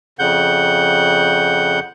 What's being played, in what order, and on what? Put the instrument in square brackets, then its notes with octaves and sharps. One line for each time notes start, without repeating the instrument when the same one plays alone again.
[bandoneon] F2 C#3 F#5 G6